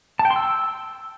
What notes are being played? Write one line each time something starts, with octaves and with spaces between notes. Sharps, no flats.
A5
G5
C6
E6